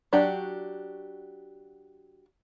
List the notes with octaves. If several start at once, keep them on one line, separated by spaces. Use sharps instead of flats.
F#3 D4 F#4 G4